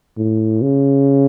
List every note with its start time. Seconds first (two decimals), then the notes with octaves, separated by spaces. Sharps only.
0.17 A2
0.62 C#3